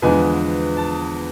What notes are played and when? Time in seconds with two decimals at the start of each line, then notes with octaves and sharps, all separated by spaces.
0.02 E2 D3 F3 G#3 B3 G#5
0.77 A5